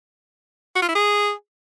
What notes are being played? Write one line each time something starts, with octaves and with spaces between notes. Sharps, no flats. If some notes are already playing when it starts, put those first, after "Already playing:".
F#4
F4
E4
G#4